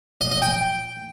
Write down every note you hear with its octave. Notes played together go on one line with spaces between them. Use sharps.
D#5
D#5
G5